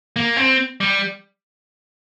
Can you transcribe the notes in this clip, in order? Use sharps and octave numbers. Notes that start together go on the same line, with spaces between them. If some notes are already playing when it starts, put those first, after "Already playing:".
A#3
C4
G3